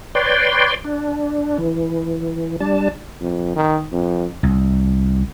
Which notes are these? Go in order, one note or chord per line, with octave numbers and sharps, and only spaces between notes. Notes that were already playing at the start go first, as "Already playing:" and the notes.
B4 C#5 D5 G5 C6
D4
E3
G3 D4 A5
F2
D#3
F2
C2